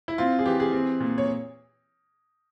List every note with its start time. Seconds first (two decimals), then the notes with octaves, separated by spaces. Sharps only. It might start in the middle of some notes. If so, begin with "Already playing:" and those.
0.08 E4
0.18 C4 F4
0.39 G#4
0.46 E3 G4
0.60 G#4
0.72 C4
1.00 A#2
1.18 C#5